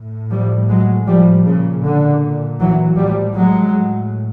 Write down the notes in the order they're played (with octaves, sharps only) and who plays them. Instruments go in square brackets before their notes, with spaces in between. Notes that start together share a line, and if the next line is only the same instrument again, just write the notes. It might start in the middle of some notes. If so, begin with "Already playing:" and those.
Already playing: [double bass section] A2
F3 G3
F#3 G#3
F3 G3
A#2 C#3
D3
E3 F#3
A2 F3 G3
F#3 G#3